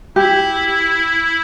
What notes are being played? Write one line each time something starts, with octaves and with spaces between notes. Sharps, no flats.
E4 G4